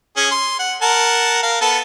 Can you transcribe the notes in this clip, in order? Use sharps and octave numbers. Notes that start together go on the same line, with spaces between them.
C#4 G#4
C6
F#5
A#4 F#5 A5
A#4 F5
B3 A4 A5